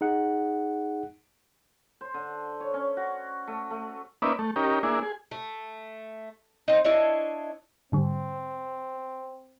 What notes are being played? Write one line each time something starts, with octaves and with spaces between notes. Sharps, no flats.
D#4 G#4 F#5
C5
D3
C#5
C#4
F#4
A3
A3
A#3 C#4 D#4 B4 D5 E5
A3
C#4 D#4 G4 A#4
A#3 D4 E4 G#4
G#4
A3
C4 D#4
D4 E4 C#5 D#5
G#2 D3 G3 C4